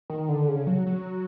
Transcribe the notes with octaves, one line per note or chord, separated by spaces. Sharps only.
D#3
D3
C#3
F#3
F#3